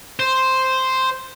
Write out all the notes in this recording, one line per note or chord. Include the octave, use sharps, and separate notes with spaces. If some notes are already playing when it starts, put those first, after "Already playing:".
C5